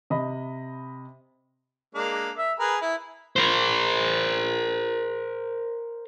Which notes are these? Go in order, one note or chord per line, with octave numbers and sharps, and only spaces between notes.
C3 D#5 B5
G#3 A#3 D4
E5
G#4 A#4 B4
E4
A#4 C5